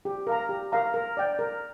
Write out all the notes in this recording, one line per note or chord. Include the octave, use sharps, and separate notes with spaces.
G4
A#4 F5 A#5
G4
A#4 F5 A#5
A#4
D5 G5
A#4